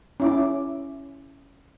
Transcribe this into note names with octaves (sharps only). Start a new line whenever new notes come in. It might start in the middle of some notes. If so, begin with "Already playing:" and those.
C#4 E4 D6